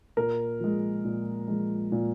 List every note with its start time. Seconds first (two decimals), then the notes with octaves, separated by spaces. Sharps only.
0.17 A#2 A#4
0.60 F3 G#3
1.05 A#2
1.48 F3 G#3
1.92 A#2